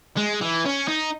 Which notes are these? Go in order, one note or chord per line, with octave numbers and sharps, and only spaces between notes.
G#3
E3
C#4
D#4